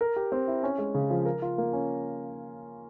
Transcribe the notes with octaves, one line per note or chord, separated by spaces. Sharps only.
A#4
G4
C4
E4
C#4
G#3
C#3
F3
A#4
F4
A#3
C#4